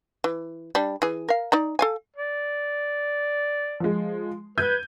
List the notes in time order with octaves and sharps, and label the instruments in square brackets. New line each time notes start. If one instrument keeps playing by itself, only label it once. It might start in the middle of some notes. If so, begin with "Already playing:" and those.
[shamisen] E3
G3 D4
E3 G#4
A#4 F5
D#4 D5 A#5
A4 F5 G#5
[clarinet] D5
[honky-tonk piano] F3 G#3
[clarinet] B4 [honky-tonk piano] G6 G#6 D#7